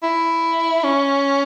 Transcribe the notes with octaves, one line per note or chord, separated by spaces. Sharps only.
E4
C#4